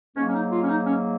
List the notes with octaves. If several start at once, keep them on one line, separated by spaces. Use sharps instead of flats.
G#2 F#3 A#3 C#4
C#4
D#4
F4
C#4
D#4
C#4